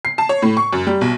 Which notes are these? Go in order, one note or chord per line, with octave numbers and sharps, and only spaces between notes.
C7
A5
C#5
A2
C#6
F#2
G3
B1